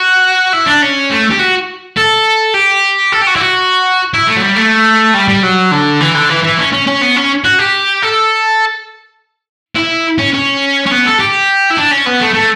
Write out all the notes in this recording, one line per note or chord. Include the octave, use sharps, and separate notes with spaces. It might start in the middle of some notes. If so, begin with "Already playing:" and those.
Already playing: F#4
E4
D4
C#4
A3
G4
F#4
A4
G4
A4
G4
F#4
E4
F#4
E4
A3
F#3
G3
A3
G3
G3
F#3
D3
E3
D3
E3
E3
C#4
C#4
C#4
B3
C#4
F#4
G4
A4
E4
C#4
C#4
C#4
B3
A4
G4
E4
D4
C#4
B3
A3
A3